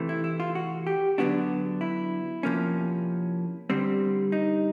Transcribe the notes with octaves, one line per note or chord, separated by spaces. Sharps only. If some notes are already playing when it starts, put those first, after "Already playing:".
Already playing: C3 E3 A3
E4
E4
F4
F#4
G4
D3 F#3 B3 D4 F#4
E4
C3 F3 A#3 C#4
D3 G3 C4
D#4